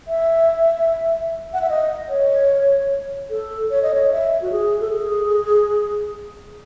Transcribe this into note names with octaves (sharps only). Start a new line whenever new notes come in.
E5
F#5
E5
D#5
C#5
A4
C#5
D#5
C#5
E5
F#4
G#4
A4
G#4